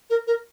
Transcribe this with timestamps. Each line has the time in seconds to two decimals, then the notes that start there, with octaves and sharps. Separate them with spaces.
0.10 A#4
0.27 A#4